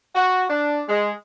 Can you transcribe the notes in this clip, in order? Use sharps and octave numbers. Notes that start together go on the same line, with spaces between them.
F#4
D4
G#3